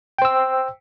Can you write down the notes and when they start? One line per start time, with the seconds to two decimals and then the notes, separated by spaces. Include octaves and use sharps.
0.18 G5
0.22 C5
0.25 E6